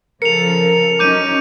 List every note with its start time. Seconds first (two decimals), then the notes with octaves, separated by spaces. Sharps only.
0.22 C#3 F3 A4 A#4 C#7 F7
0.99 F#3 C#4 D#4 D6 G6 D#7